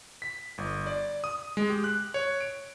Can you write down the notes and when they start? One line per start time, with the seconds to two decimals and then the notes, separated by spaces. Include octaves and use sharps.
0.22 B6
0.58 G1
0.87 D5
1.24 D#6
1.57 G#3
1.70 G4
1.84 F#6
2.14 C#5
2.41 D7